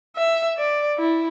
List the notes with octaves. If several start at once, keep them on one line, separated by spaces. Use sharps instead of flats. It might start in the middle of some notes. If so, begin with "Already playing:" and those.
E5
D5
E4